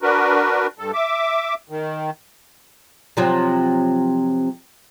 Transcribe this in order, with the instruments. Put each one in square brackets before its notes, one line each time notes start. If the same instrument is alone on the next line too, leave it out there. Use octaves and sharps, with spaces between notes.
[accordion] D4 F#4 A#4 B4
G2 A4
E5 D6
D#3
[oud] C3 F3 F#3